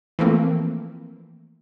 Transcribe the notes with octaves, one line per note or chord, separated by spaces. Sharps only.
E3 F3 A3 A#3 C4